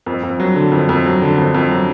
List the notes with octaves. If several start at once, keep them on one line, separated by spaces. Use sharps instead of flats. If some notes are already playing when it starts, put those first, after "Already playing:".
F2
F2
F#3
D3
F2
F2
F#3
D3
F2
F2
F#3